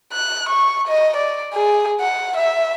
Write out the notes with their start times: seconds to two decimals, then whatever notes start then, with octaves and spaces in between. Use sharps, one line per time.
0.13 F#6
0.49 C#6
0.88 D#5
1.17 D5
1.54 G#4
2.01 F#5
2.37 E5